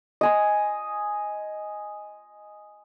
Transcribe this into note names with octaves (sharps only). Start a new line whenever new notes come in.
D#5 G#5 C6